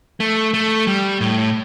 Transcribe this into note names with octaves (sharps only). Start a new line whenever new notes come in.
A3
A3
G3
A2